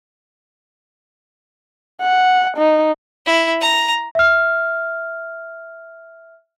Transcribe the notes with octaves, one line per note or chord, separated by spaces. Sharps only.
F#5
D#4
E4
A#5
E5 F6